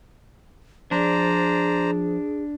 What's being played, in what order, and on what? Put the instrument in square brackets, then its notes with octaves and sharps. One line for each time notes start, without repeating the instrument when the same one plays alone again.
[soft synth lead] F3 [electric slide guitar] D4 [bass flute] G#4 [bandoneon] C5 D5 A#5